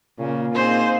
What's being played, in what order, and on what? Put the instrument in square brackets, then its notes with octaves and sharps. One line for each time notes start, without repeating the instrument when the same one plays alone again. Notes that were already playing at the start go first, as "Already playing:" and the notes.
[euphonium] A#2 [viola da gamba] C#3 A#3
[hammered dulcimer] A#3 [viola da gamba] C4 D#4 G#4 [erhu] C5